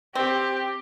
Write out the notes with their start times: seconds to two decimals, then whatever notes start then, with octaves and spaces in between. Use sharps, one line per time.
0.15 C4 G4